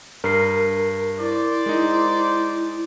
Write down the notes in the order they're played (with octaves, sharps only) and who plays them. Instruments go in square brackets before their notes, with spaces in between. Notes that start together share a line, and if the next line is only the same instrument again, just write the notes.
[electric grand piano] G2 [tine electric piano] A#4 C7
[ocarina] E4 [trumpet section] C5 D5
[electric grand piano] G#3 D#4